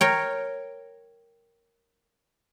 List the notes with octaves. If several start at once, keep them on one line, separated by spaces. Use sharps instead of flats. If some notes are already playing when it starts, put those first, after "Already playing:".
A#4 C#5 G5